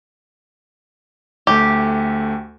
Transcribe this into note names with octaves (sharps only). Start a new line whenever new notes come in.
D2 A3 G4